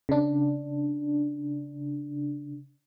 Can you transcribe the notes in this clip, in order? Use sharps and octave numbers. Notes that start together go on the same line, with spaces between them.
C#3 D4